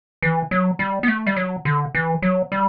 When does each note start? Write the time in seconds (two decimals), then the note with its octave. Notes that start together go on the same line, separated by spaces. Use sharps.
0.22 E3
0.51 F#3
0.79 G3
1.03 B3
1.08 A3
1.27 G3
1.36 F#3
1.65 D3
1.95 E3
2.22 F#3
2.52 G3